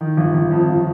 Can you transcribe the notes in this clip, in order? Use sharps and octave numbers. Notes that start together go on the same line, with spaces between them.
D#3
G1
G1
F2
G1